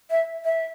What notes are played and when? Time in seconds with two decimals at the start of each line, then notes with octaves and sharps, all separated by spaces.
0.11 E5
0.45 E5